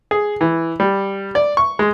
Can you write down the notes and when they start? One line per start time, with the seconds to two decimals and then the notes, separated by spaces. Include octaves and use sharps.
0.11 G#4
0.41 E3
0.80 G3
1.35 D5
1.57 C#6
1.79 G#3